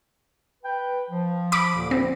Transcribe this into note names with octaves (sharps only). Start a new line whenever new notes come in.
B4 G5
F3
B5 D6
D#2 A#2 D3
C4